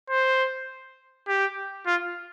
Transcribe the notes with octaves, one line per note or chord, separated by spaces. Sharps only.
C5
G4
F4